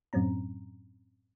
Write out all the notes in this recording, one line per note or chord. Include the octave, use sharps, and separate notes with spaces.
F#2 A2 F#3 C4 C#4 A#5